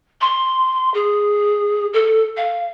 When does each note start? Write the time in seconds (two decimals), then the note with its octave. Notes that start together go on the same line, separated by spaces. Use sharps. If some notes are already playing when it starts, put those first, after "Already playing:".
0.21 C6
0.94 G#4
1.93 A4
2.37 F5